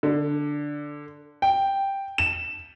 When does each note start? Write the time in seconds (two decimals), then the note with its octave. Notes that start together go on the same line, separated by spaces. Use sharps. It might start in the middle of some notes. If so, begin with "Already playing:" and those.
0.03 D3
1.42 G5
2.18 E7